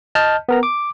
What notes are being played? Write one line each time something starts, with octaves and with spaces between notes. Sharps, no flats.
D#5 A5 F6 G6
B3 A#4 A#5
D6